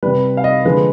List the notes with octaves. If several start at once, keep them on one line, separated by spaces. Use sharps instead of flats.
C3 G3 B4
F5
D#5
D3 F3 G#3 B4